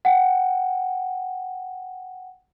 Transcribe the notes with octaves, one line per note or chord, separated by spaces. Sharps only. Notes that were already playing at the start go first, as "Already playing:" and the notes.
F#5 G5